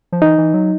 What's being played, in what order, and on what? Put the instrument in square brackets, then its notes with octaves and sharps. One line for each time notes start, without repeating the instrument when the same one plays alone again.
[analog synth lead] F3
[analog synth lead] E3 [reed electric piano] D#4
[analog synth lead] E3
F#3